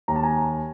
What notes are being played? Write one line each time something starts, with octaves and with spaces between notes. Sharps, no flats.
D#2 A#5
A5
G#5 A#5